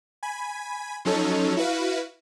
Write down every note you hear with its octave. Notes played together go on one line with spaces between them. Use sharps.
G#5 B5
F3 F#3 C#4 D#4 A4 C#5
E4 F#4 B4 F5